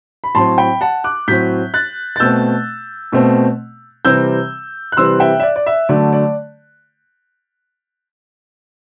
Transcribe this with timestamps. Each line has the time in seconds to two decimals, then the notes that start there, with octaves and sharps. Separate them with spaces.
0.24 B5
0.35 A2 F#3 C4 A5 C6
0.58 G5 B5
0.81 F#5 A5
1.04 D6 F#6
1.28 A2 F#3 C4 G6 B6
1.74 F#6 A6
2.16 A6
2.20 B2 A3 C4 E6 G6
3.12 B2 A3 C4
4.05 C3 E3 G3 C4 E6 G6
4.92 F#6
4.97 C3 E3 G3 C4 C6 E6
5.20 E5 G5
5.40 E5
5.43 D5
5.56 D5
5.66 E5
5.89 D3 F#3 A3 D5
6.13 D5